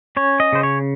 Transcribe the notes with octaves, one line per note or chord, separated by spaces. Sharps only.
C#4 C#5
D#5
C#3 C5
C#5